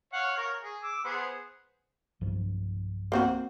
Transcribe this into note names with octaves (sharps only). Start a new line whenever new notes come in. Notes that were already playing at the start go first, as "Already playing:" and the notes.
C#5 F5 F#5
A#4 C#5
G#4
D6 E6
B3 G#4 C5
B1 G2 F3
A#3 C4 F#4